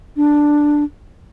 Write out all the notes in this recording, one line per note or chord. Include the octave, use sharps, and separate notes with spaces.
D4